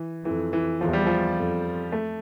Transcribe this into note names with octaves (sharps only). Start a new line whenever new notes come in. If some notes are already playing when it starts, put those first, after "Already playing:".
Already playing: E3
F2 E3
E3
E2 F3
G3
F3
F2
A3